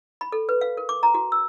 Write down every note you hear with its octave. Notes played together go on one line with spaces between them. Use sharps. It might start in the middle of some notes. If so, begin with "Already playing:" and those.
B5
A4
B4
F5
A#4
D6
A#5
F#4
E6